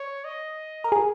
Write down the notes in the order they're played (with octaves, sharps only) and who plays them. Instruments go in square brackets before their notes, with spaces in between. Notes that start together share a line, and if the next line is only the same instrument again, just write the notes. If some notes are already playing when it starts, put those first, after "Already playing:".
Already playing: [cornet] C#5
D#5
[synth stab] A#4
G#4